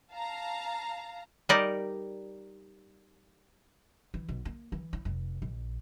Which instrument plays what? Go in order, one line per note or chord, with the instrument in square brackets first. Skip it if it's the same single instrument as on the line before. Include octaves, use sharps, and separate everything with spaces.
[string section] F5 A5 A#5
[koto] G3 D#4 G4 A#4 D5 D#5
[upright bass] E3
B1
A#3
E3
E4
F1
A#1